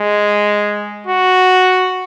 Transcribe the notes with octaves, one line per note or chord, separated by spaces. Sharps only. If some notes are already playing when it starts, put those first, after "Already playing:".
Already playing: G#3
F#4